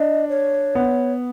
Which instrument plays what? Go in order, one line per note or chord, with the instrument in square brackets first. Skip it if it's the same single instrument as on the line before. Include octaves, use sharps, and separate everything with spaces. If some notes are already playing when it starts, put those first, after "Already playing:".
Already playing: [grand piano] D4 [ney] D#5
[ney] C#5
[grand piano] B3